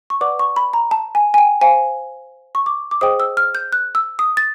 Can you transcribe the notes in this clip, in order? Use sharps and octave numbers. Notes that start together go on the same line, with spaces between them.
C#6
B4 D5 F#5 D6
C#6
B5
A#5
A5
G#5
G#5
G5
C5 F5 G#5
C#6
D6
D6
G#4 C5 D#5 G5 D#6
E6
F6
G6
F#6
E6
D#6
A6